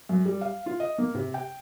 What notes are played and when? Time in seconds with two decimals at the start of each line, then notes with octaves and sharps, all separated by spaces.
0.09 F#2
0.26 G3
0.41 F5
0.66 F4
0.80 D#5
0.98 A#3
1.15 C3
1.34 G5